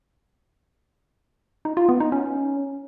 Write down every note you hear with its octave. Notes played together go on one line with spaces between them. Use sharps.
D#4
F4
B3
D#4
C#4